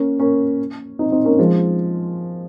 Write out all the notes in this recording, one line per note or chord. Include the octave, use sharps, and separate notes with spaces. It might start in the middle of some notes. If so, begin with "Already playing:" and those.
Already playing: A#3 C#4
A#3 C#4
C4 D#4
C4 D#4
A#3 C#4
F3 G#3